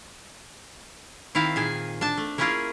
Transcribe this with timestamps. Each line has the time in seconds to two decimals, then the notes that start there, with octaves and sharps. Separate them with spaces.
1.35 D#3 C4 E4 F5
1.56 A#2 D#3 G#4 G#5
2.01 D4 A5
2.17 A3
2.38 A#3 C#4 E4 F4 G#4 A#4